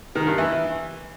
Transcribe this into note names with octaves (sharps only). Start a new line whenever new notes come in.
D#3
G2
E3